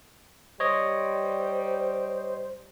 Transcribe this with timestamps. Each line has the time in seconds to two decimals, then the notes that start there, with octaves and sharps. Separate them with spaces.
0.60 G3 C5 C#5 D#5